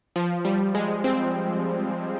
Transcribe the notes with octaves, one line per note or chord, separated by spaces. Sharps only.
F3
G3
G#3
C4